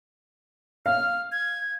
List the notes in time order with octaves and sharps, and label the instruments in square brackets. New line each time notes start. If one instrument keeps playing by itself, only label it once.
[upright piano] F5 [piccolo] F6
[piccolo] G#6